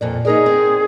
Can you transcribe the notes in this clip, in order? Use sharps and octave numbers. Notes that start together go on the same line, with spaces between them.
F2 A#2 D5
D#4 G#4 A#4 D5
C4